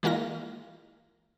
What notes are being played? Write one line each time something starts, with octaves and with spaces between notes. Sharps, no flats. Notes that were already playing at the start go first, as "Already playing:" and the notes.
E3 G#3 A#3 F4 A#6